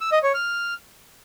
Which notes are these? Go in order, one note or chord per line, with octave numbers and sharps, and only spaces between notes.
E6
D#5
C#5
F6